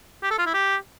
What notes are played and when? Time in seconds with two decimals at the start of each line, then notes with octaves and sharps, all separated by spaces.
0.23 G4
0.31 A4
0.38 F4
0.46 E4
0.54 G4